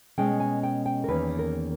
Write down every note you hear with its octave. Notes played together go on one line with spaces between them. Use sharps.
B2 G#3 C#4 G5
G#5
G5
G5
A#4
E2 D#3 A#3 C#4 B4
A#4